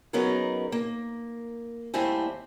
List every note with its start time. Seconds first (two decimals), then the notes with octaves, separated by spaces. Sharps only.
0.13 F#3 B3 C#4 D#4 G#4 A#4
0.72 A#3
1.94 D#2 G3 A3 C4 E4 G#5